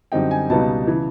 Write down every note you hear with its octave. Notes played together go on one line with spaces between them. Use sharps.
F#2 D3 G3 C4 D#4 G5
G#5
C#2 B2 G3 B3 D#4 A5
C#3 E3